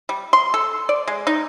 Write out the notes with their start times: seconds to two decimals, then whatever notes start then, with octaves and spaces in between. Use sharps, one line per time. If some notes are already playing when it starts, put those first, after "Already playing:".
0.09 G3
0.33 C6
0.54 A4
0.89 D5
1.07 G#3
1.27 D#4